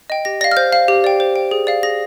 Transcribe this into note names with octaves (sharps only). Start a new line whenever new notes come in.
D#5 G5
G4 A#6
D5 F5 A#6
F6
C5 G6
F5
G4
D5 G5
C5
G5
G#4
D5 F5
G#4 A#6